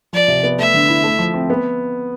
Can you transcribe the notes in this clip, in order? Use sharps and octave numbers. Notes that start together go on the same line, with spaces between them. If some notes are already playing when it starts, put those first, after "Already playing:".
F3 D5
C3
B3
A3 E5
D3
E4
A3
F3
C4
B3